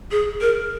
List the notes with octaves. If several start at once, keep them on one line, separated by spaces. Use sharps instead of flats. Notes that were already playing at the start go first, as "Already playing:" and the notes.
G#4
A#4